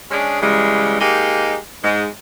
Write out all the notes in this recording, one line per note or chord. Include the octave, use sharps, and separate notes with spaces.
G#3 C#4 D4 G#4
C#3 E3 G3 G#3
G#3 A#3 D#4 G4
G#2 G#3